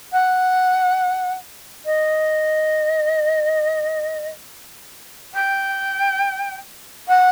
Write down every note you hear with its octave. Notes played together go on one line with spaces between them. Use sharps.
F#5
D#5
G5
F#5